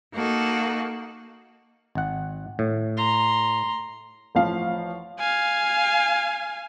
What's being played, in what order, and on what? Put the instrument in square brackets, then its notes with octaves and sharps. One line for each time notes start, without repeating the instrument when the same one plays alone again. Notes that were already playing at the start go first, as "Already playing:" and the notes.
[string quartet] A#3 D#4 F#4 A4
[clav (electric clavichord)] G#1 F#5
A2
[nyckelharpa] A#5 C6
[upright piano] A1 F3 F5
[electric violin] F5 G#5